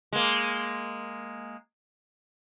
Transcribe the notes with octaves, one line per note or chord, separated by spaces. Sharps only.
G#3 A#3